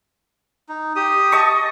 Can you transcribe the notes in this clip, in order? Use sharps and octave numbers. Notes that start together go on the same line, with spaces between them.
D#4
G4 D#6
D#5 A5 C#6